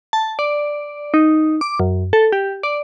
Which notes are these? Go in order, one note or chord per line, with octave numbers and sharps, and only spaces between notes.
A5
D5
D#4
D6
F#2
A4
G4
D5